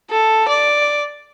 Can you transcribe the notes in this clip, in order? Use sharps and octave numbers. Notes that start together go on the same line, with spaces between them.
A4
D5